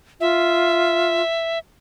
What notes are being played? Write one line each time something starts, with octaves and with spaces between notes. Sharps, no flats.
F4 E5